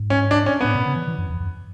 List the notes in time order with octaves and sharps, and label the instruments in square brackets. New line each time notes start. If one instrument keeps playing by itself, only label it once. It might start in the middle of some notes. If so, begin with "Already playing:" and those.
Already playing: [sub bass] G#2
[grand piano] C#4
D4
C#4
[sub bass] A2 [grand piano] B3
[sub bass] B2
C#3
E3
E3
F#2
E2
F#2